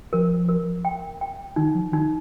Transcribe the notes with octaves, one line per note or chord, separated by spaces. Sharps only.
F3 A#4
A#4
G5
G5
D#3 D#4
F3
D#3 D#4